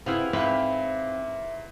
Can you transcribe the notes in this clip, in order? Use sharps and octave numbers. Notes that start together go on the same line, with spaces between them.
C3 E4 G#4 B4 C5 F5 F#5
G#2 C4 B4 E5 F5 B5